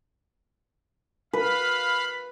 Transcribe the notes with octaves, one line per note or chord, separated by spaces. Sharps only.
B4 F5 B5